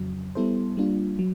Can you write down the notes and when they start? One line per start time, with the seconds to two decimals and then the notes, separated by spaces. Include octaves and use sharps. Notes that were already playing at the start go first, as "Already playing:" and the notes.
Already playing: F2 C#3 F#3
0.35 G3 B3 E4 A4 C5
0.77 G3 A#3 D4 F4
1.19 F#3